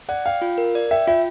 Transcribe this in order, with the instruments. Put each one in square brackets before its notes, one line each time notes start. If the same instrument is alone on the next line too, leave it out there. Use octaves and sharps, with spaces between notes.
[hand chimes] D5 [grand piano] F#5
[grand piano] F5 [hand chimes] G5
[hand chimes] F4
A#4
D5
[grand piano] E5 [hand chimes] G5
[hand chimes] F4 [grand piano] E5